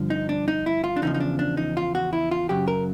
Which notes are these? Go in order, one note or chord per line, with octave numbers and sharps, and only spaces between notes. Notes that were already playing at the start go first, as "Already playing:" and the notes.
Already playing: G2 D3 F3
D#4
D4
D#4
E4
F4
D4
E2 C#3 F3 D#4
D#4
D4
D4
D#4
F4
F#4
E4
F4
F#2 C#3 F#3 G4
A#4